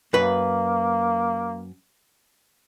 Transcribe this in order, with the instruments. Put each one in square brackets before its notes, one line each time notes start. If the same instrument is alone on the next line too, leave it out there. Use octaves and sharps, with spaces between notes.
[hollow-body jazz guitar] F#2 B4 [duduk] A#3